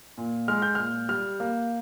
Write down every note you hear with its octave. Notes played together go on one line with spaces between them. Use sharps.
A#2
G#3 F6
G6
A#2 F6
G3 F6
A#3